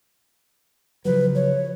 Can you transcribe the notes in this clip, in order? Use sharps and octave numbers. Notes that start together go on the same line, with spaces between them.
C#3 F3 F#3 B4
C#5